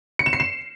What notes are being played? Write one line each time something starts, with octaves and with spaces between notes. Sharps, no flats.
C#7
E7
C7
E7